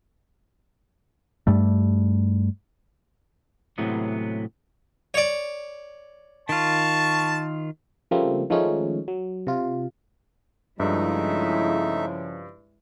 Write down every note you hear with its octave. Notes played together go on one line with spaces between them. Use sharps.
G2 G3 A3
A2 C3 E3 F#3 G#3 B3
C#5 D5
D#3 F4 A5 C#6
C#3 F3 G3 A3 A#3 C4
D#3 F3 G#3 A3 C#4 D#4
F#3
C3 F4
G2 C#3 F3 G#3 A3 D#4 E4 E5